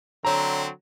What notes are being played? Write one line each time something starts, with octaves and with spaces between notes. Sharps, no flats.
D3 F#3 C4 C#5 A#5